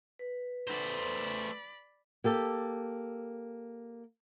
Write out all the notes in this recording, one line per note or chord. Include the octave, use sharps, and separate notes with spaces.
B4
A3 C5 D5 B5
A#3 G4 A4